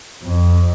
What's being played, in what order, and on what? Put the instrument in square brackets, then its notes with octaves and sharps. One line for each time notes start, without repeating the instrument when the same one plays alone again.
[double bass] F2